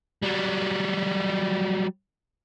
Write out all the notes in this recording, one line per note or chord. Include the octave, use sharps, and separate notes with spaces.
F#3 G3